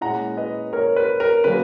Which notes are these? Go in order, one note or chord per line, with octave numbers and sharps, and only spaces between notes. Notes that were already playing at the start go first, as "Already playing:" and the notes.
A#2 G#3 C#4 E4 F#5 A#5
B4 D#5
A#4 C#5
B4
A#4
C#3 F#3 A#3 B4